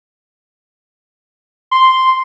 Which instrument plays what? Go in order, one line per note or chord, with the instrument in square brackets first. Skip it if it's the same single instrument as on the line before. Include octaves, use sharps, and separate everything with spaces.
[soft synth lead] C6